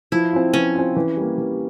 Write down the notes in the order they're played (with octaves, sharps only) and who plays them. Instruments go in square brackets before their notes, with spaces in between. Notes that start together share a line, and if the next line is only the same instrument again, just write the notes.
[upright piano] F3 [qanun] E4
[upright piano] C4 F4
[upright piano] F3 [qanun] C#4
[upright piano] C4 F4
E3
G3 A#3
E3